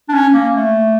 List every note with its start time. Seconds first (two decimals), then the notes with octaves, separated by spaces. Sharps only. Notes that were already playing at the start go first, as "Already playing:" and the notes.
0.09 D4
0.14 C#4
0.34 A#3
0.55 A3